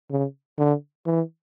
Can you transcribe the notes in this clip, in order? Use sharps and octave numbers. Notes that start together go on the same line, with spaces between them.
C#3
D3
E3